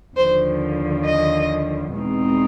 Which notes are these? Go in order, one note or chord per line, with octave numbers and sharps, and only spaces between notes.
D#2 D3 F3 C5
D#5
E2 B2 G#3 C4 D#4